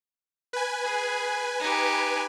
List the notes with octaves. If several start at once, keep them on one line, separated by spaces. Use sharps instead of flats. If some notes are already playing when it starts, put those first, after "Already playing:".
B4 G#5
G#4
D#4 G4